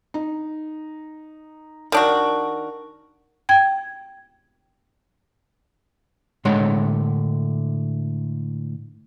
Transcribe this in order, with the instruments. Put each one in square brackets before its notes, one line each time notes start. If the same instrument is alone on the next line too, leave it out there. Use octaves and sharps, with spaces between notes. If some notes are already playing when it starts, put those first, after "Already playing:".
[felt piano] D#4
[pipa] D#3 D4 F#4 [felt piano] A#4
[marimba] G5 G#6
[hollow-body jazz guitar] A2 D3 G#3 C#5 F#5 C6